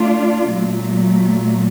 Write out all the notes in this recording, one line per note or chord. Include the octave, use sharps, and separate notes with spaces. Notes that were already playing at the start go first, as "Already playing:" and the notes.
Already playing: A3 D4 F4
A#2 F#3 A3